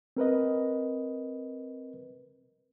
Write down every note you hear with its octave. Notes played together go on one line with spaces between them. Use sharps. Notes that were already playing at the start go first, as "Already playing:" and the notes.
C4 A#4 B4 D#5